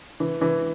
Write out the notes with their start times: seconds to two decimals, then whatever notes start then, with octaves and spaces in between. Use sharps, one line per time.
0.20 E3
0.41 E3